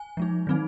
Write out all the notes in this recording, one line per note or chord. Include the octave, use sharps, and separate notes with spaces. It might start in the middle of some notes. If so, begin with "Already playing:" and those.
Already playing: G#5
F3 G#3 D#4
D#3 F#3 C4 D#4